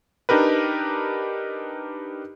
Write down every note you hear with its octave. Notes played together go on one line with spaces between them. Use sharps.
D4 D#4 G4 A#4 B4